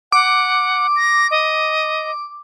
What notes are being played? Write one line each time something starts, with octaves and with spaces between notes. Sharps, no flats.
F#5 D6
A#6
D#5